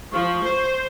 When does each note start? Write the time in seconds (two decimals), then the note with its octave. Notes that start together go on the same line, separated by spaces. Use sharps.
0.13 F3 C#6
0.43 C5